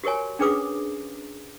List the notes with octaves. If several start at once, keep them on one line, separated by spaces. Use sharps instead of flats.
F#4 G4 A#4 C#5 G#5
C#4 D4 G#4 B4 D6 D#6